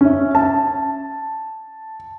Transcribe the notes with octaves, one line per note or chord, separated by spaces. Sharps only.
C#4 E5
A5